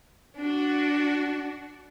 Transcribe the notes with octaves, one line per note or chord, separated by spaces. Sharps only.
D4 F#4